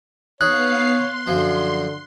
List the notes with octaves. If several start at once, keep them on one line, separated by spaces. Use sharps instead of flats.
B3 D#4 G#4 C#5 F5 F#6 C7
C6
F#2 D3 F3